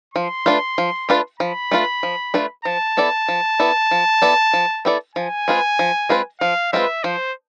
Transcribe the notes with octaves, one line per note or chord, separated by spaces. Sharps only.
F3 C6
A3 D4 F4 B4
F3
A3 D4 F4 B4
F3 B5
A3 D4 F4 B4
F3
A3 D4 F4 B4
F3 A5
B3 E4 A4 D5
F3
B3 E4 A4 D5
F3
B3 E4 A4 D5
F3
B3 E4 A4 D5
F3 G#5
G#3 C4 F4 B4
F3
G#3 C4 F4 B4
F3 F5
G#3 C4 F4 B4 E5
F3 C5